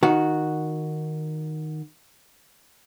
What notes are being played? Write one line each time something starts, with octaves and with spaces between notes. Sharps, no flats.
D#3 F#4